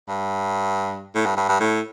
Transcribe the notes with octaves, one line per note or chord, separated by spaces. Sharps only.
G2
A2
G2
G2
G2
A2